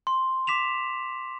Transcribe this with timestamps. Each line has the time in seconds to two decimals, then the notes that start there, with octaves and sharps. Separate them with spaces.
0.07 C6
0.47 D6 B6 E7 F7